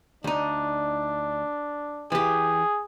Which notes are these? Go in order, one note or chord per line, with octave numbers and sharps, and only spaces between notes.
D2 D4 D#4
E3 G4 G#4